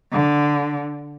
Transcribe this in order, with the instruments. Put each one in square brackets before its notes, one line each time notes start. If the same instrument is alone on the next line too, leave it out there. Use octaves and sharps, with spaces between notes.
[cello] D3